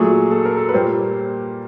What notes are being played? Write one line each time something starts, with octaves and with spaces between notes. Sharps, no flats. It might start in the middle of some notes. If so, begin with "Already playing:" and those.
Already playing: A#2 F#3 A3 G#4
A4
A#4
A4
B4
A#2 G3 A#3 C5